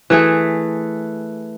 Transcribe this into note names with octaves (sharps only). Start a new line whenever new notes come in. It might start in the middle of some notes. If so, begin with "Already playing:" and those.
E3 A3 G#4